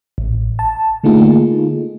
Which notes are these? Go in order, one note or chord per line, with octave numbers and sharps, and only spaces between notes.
A1
A5
D3 A3 A#3 D#4 F4 G#4